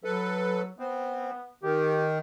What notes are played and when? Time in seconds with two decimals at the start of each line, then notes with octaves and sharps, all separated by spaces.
0.04 F#3 A4 B4
0.79 B3 C4
1.64 D#3 G4